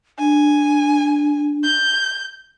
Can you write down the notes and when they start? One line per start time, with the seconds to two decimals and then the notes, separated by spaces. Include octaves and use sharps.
0.19 D4 G#5
1.64 G6